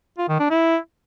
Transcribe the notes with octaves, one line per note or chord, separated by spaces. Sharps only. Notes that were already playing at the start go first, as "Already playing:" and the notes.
F4
D#3
D4
E4